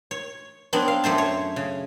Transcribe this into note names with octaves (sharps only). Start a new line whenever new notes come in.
C#5
F#3 B3 C4 D4
F5
F#2 A3 C5 A5
C#5
C#3